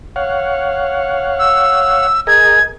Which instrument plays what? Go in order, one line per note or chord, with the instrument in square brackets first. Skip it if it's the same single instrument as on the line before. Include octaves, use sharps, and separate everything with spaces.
[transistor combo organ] C#5 F5 F#5
[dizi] E6
[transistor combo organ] G#4 A#4 D#5 [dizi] G#6